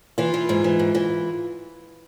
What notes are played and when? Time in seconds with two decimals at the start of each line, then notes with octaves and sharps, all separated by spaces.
0.18 E3 F4
0.34 E3
0.49 G#2
0.64 E3
0.79 G#2
0.95 E3